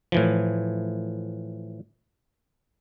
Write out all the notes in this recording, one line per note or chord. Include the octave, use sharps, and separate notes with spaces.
A2 E3 F3